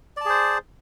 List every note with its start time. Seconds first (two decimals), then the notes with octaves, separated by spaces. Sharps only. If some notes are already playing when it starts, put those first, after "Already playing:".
0.17 D5
0.21 A5
0.25 G#4
0.30 C5